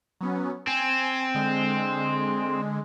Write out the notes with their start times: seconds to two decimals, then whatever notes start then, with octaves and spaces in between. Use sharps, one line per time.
0.21 F#3 B3 C#4
0.67 C4 G#5
1.34 D3 G#3